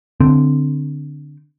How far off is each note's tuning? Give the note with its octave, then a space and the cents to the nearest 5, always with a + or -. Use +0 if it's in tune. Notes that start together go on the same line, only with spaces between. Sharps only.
D3 +0 C4 -10